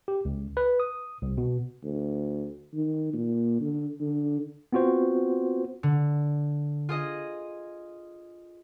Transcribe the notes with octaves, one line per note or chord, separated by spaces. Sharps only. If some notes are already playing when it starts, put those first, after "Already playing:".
G4
C#2
B4
D#6
C2
B2
D2
D#3
A#2
D3
D3
B3 C4 F4 F#4 C5
D3
F4 G#4 D#5